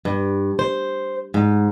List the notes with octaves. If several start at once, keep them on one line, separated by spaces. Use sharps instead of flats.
G2
C5
G#2